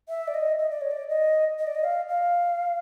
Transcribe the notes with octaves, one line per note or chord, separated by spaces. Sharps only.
E5
D5
D#5
D#5
D5
C#5
D5
D#5
D#5
D5
D#5
F5
F5